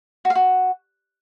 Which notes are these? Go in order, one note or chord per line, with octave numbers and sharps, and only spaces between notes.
F#4
F5
F#4